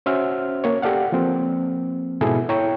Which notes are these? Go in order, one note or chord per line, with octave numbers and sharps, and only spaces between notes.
C#4 F#4 C5 E5 F6
A#3 C#5
G4 A4 D5 F5 F#5
F3 A#3 C4
G#2 B2 E4 G#4 A4
E4 C#5 G5 A#5 C#6